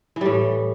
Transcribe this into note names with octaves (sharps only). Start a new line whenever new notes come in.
A2 E3 G3